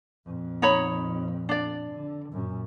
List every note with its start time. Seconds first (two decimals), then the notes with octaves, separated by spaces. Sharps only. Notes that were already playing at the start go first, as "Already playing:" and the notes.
0.26 F2 A#2
0.62 D#4 C#5 B5
1.49 D4 D5
1.91 D3
2.32 F#2 A#2